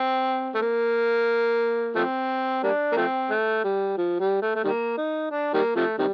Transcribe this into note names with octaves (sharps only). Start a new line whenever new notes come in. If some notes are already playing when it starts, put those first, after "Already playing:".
Already playing: C4
A3
A#3
F3 A3 C4
G3 A#3 D4
A#3
F3 A3 C4
A3
G3
F3
G3
A3
A3
D#3 G3 A#3
D#4
D4
D#3 G3 A#3
C3 F3 A3
C3 D#3 G3